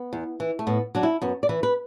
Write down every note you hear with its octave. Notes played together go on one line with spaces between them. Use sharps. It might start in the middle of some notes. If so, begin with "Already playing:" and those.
Already playing: B3
E2
E3
A3
A2 B3
F#3 D4
E4
F#2 B3
D5
E3 B4
B4